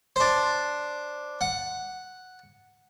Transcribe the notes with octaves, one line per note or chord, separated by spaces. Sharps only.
D4 C5
F#5